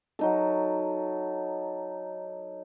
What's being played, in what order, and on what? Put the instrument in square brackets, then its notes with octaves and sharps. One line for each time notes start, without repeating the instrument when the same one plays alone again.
[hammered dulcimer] F#3 D#4 A4